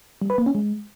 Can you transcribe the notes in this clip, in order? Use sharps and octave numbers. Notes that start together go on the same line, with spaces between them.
G3
B4
A#3
C#4
G#3